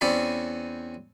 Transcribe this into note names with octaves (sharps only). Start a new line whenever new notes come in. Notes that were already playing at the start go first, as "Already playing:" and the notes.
E2 C4 C#4 D5 B5